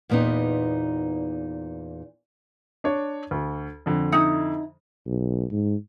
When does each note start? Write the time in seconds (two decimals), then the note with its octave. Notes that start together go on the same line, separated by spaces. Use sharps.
0.09 E2 A#2 B3 C4 D#4
2.84 D4 C#5
3.31 D2
3.86 F2 D3
4.12 D#4 E4 F#5
5.07 B1
5.51 G#2